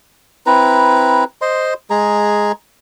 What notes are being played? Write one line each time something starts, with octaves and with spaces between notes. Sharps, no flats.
C4 E4 B4 A#5
C5 D#5 C6
G#3 G#4 A#5